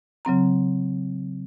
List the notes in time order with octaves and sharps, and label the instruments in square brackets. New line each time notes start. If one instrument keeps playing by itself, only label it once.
[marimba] C#3 F#3 C4 A#5